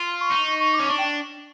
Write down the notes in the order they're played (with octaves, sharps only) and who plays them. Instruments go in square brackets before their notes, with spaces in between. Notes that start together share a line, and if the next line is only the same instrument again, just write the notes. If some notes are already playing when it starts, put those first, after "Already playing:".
Already playing: [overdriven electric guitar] F4
[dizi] C6
C#6
[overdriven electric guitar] D#4
[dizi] C#6
[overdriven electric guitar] C#4 [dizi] D6
[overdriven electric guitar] D4 [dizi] C#6
[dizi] G5